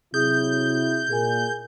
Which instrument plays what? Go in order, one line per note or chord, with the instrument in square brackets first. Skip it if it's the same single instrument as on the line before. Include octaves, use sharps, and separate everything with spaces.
[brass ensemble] C3 F#3 E4 [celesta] G#4 D#6 [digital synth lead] G6
[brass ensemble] A#2 [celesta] G#4 A#4 G#5